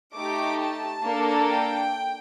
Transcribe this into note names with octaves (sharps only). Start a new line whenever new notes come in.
A3 D#4 G4 D6
A5
A#3 D4 A4
G5